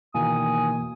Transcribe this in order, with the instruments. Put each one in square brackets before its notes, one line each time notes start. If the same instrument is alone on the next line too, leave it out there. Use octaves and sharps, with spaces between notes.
[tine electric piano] B2 E3 A#3 [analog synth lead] D#3 [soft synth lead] G#5 [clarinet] D#6